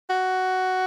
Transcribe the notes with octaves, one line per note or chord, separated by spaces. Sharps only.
F#4